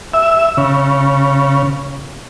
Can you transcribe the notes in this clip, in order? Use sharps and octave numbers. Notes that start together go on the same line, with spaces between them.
E5
C#3